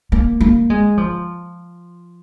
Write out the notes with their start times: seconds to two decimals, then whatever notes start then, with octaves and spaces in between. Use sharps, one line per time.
0.12 A#3
0.40 A#3
0.70 G#3
0.97 F3